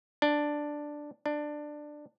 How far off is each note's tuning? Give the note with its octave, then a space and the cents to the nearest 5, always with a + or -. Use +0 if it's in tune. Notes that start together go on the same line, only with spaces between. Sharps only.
D4 +5
D4 +15